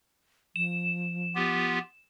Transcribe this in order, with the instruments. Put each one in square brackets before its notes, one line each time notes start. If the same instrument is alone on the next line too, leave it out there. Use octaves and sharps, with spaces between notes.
[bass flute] F3 [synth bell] E7
[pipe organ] B3 F4 G4